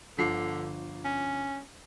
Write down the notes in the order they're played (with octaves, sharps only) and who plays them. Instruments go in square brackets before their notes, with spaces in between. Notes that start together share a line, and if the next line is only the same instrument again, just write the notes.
[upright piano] G1 F3 C7 [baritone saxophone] D3
[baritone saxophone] C#4